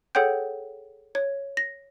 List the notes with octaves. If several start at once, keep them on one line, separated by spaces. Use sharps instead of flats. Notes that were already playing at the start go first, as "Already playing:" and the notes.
G#4 A4 C#5 F#5 G5 G6
C#5
A#6